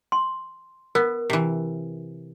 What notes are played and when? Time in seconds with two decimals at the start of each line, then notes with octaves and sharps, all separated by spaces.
0.12 C6
0.95 B3 A#4
1.30 C3 E3